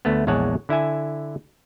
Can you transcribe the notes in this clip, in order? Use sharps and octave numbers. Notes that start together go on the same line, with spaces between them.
D2 A3 B3
A#1 E2 G#3 C#5 F#5 A5
D3 E4 E5 G#5